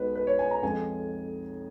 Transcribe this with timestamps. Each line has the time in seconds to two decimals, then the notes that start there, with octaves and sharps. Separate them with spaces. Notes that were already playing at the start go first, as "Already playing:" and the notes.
Already playing: B1 B2 G#3 B4
0.16 B4
0.27 C#5
0.39 G#5
0.51 A#5
0.62 F2 F3 G#3 G#5